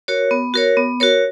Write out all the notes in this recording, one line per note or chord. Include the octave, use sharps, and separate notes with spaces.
F#4 A#4 C#5
B3
F#4 A#4 C#5
B3
F#4 A#4 C#5